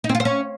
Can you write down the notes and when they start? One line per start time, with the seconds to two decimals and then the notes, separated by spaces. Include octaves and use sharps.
0.04 D#4
0.09 C4
0.15 F4
0.20 C5
0.25 C#4